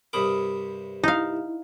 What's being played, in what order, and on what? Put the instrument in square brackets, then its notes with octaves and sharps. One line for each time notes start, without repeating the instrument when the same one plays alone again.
[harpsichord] G2 C3 D6 [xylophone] A#4 B5 D#6
[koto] D#4 F5 [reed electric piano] E4